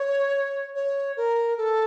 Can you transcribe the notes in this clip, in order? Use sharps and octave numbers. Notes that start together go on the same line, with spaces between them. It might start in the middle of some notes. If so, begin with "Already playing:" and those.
Already playing: C#5
C#5
A#4
A4